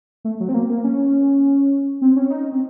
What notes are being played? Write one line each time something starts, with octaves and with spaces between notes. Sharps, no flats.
A3
F#3
C4
A#3
A#3
C#4
C4
C#4
D#4
C4